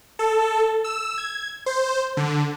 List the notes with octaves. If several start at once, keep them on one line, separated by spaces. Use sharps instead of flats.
A4
E6
G#6
C5
D3